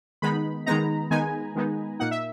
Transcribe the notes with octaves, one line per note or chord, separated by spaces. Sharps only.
D#3 G#3 B3 D#4 B5
D#3 G#3 B3 D#4 A#5
D#3 G#3 B3 D#4 G#5
D#3 G#3 B3 D#4
A#2 A#3 D#4 F#5
E5